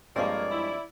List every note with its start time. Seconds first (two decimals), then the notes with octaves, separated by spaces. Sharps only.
0.16 G2 F3 G#3 A#3 C4 G#4 C#5 D5
0.51 E4